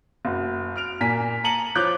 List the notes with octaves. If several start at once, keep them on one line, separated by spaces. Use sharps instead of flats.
F#1 F#4
F6 D7 F7
A#2 A#3 G#5 B6
A5 A#5 C#7 D#7 F#7
F3 F4 C#5 D6 F#6 G6